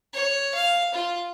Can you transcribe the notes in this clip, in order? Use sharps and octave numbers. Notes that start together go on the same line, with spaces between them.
C#5
F5
F4